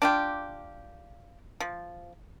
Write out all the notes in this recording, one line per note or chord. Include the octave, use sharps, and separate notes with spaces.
D4 F4 G4
F3